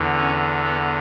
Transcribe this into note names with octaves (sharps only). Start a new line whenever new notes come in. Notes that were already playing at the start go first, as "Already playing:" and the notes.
Already playing: E2 D3
C#4
B3